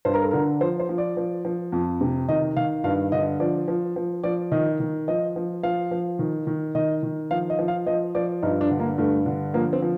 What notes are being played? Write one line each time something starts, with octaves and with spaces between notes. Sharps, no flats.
G2 C5
A#4
A4
D3 A#4
F3 C5
C5
F3
D5
F3
F3
F2
C3
D#3 D#5
D#3 F5
G2 F5
D3 D#5
F3 D5
F3
F3
F3 D5
D#3 D#5
D#3
F3 D#5
F3
F3 F5
F3
D#3
D#3
D#3 D#5
D#3
F3 F5
D#5
F3
F5
F3 D#5
F3 D5
G2 D#4
D4
D3
A#3
G2 A3
D3
F3 A#3
C4
F3